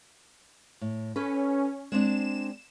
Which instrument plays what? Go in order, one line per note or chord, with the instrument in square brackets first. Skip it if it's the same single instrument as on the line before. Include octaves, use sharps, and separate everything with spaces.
[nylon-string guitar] A2
[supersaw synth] C#4 [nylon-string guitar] A4 B4
[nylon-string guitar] G#3 C4 D4 [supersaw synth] E7